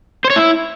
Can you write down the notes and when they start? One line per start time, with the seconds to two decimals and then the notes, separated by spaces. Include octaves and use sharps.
0.25 C5
0.30 C#5
0.36 E4